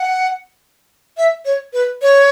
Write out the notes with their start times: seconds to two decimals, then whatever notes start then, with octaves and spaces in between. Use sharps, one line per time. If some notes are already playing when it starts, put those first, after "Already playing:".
Already playing: F#5
1.17 E5
1.45 C#5
1.73 B4
2.02 C#5